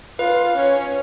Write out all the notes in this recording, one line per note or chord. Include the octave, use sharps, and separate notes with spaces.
F4 B4 F5
C#4 C#5